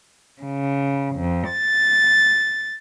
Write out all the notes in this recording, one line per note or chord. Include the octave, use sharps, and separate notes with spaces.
C#3
F2
A6